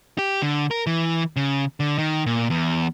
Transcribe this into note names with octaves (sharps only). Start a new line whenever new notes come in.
G4
D3
A#4
E3
C#3
D3
D#3
A#2
E2